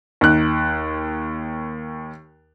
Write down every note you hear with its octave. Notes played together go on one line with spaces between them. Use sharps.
D#2 F#6